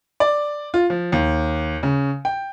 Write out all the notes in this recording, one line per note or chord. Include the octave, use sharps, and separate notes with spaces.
D5
F4
F3
D#2
C#3
G5